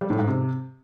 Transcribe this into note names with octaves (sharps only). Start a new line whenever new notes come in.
G3
A2
G#2
C3